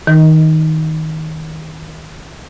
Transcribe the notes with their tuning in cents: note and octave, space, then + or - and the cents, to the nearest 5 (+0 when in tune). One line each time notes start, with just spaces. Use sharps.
D#3 +20 D#4 +0